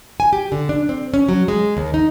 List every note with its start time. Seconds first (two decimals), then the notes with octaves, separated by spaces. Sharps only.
0.20 G#5
0.33 G4
0.52 D3
0.69 D4
0.89 C4
1.14 C#4
1.29 F#3
1.48 G#3
1.77 D#2
1.94 D#4